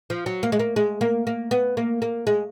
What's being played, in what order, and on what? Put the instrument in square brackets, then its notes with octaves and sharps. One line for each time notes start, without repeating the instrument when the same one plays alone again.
[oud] F3
F#3
A#3
G#3
A#3
G#3
A#3
A#3
B3
A#3
A#3
G#3